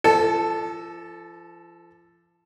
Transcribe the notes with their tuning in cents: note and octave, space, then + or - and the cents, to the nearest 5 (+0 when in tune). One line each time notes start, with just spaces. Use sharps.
F3 -35 A4 +0 A5 -30